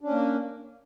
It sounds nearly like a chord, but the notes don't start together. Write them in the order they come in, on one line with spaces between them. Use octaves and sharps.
D4 C#4 A#3